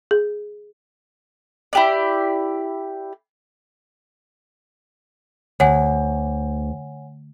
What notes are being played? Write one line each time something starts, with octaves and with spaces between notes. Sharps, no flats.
G#4
E4 G4 D5
D2 C#5 F#5 G#5